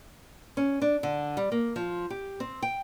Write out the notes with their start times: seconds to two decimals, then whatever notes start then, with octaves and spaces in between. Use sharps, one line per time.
0.57 C#4
0.82 D4
1.03 D3
1.37 G3
1.52 A#3
1.76 F3
2.10 G4
2.40 C4
2.62 G5